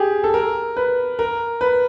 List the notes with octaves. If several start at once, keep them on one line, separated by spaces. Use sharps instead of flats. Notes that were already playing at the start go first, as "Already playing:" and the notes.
Already playing: G4 G#4
A4
A#4
B4
A#4
B4